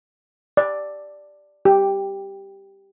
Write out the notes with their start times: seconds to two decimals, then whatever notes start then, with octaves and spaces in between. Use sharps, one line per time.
0.57 D5
1.65 G4